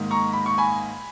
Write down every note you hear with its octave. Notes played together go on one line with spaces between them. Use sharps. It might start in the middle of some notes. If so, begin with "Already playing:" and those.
Already playing: G#2 D#3 A#3
A#5 C#6
B5
C#6
G#5 B5